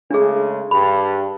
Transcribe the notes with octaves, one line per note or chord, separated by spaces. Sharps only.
C#3 G#3 A3 D4 G#4
G2 B5